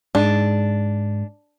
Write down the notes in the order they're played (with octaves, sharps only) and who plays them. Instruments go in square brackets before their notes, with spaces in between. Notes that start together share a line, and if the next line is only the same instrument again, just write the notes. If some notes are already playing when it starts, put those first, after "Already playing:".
[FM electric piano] G#2 G#3 [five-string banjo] D4